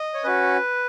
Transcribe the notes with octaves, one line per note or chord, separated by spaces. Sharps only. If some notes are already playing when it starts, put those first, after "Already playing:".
Already playing: D#5
C#5
C#4 F#4 B4